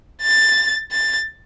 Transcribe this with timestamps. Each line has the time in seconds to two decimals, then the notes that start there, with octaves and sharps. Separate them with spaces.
0.22 A6
0.92 A6